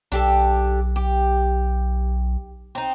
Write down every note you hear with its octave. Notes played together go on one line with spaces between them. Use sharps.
B1 D4 G4 A4
G4
C4 D#4